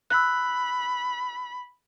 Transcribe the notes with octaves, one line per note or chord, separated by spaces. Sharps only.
B5 E6 F#6